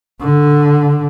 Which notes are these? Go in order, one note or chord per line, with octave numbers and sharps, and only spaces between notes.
D3